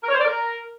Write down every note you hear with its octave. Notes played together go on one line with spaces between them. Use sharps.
A#4
C#5
C5
D5
A#4